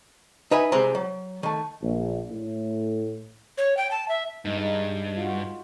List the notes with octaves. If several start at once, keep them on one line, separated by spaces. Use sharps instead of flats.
D#4 B4 E5 G#5
C2 C3 G#3 C4 A#5 B5
F#3
D#3 A3
A#1
A2
C#5
G5
A5
E5
G2 G#3 D#4
D#4
F4 F#4